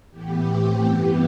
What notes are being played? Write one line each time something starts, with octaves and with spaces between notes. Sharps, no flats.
A2 E3 B3 G4
A2 E3 A3 C4
G2 E3 B3 G4